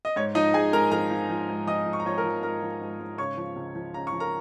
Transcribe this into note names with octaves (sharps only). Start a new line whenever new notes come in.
D#5
G#2 C#5
F3 D#4 D#5
G#2 G#4 G#5
G#2 A#4 A#5
F3 A#4 A#5
F3
F3
G#2
F3 D#5 D#6
F3
C#6
A#5
F3 C#5 C#6
A#4 A#5
F3
G#2 A#4 A#5
F3
G#2
G#2
C#3 C#5 C#6
F3
C#2
F3
C#3 A#5
C#6
F3
A#4 A#5